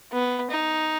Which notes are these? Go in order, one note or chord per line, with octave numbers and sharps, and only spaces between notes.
B3
D#4